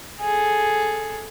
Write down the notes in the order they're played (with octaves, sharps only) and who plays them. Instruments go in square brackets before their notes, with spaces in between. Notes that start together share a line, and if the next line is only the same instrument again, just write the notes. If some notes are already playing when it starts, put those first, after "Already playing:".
[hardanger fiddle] G#4 A4